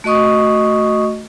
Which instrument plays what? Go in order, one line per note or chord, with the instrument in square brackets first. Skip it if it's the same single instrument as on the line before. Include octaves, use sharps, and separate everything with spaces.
[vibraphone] A3 F#4 D#5 C#6 D#6